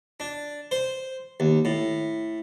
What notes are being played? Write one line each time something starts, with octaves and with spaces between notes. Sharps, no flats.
D4
C5
D#2
A2